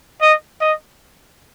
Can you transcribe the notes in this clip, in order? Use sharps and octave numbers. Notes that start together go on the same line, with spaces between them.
D#5
D#5